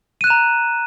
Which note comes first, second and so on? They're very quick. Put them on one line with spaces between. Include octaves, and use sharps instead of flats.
D#7 F#6 E7 A#5